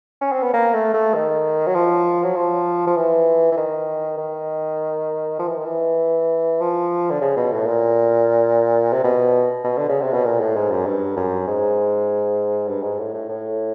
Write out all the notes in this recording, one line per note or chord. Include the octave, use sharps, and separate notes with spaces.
C#4
C4
B3
A#3
A3
A3
D#3
F#3
F3
F#3
F3
F3
E3
E3
D#3
D#3
F3
E3
D#3
E3
F3
D3
C#3
B2
A2
A#2
C3
B2
B2
D3
C#3
C3
B2
A#2
A2
G#2
F#2
G2
F#2
G#2
G2
G#2
A2
A2
A2